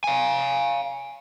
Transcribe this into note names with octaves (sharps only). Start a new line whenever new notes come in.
F5 G#5